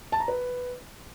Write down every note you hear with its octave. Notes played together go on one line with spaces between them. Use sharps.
A5
A#5
B4